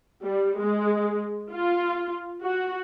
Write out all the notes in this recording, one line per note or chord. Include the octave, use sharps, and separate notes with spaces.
G3
G#3
F4
F#4